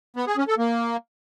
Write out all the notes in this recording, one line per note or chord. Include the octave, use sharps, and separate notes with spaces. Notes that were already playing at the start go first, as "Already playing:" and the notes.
B3
G#4
C#4
A4
A#3